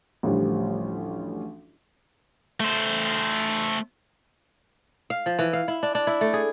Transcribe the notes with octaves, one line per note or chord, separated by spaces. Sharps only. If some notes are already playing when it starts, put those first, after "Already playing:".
A1 D2 F3 G3
A3 C5
F5
F3
E3
F5
E4
D4
D4
E4
A3
G#4